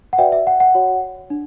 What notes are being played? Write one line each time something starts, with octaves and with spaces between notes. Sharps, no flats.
F#5
F#4 B4 D5 E5 G5
E5
F#5
F#5
F#4 C#5
D4